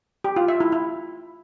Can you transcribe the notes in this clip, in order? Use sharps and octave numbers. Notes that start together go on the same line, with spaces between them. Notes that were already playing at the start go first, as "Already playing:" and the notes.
G4
F4
E5
E4
E4